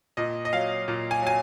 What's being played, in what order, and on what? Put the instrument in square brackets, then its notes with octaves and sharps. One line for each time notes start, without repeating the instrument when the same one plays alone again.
[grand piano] A#2 D#5
D#5
F#3 F5
A#2
G#5
F#3 G#5